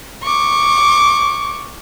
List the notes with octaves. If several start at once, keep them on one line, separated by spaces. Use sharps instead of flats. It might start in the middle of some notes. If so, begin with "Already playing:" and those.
C#6 D6